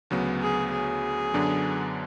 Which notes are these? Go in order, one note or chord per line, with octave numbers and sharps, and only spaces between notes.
D2 C#3 F#3 B3
G#4
G#4
F#2 D3 F#3 B3 D4